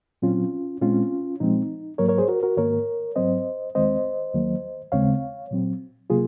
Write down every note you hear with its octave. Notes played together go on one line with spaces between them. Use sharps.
A#2 F#3 C4 C#4 F4
A#2 G#3 C4 C#4 F4
A#2 F3 G#3 C4 D#4
G#2 F#3 A#3 A#4 C#5
A#4 C#5
G#4 C5
F#4 A#4
F#4 A#4
G#2 D#3 A#3 A#4 C#5
G#2 F#3 C4 C5 D#5
D#2 D#3 G#3 C4 C5 D#5
D#2 D#3 F#3 A#3
D#2 C#3 G#3 C4 C#5 F5
A#2 F#3 C4
C3 F#3 A#3 F4 G#4